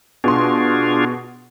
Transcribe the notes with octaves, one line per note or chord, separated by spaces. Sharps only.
B2 D4 F4 G#4 C6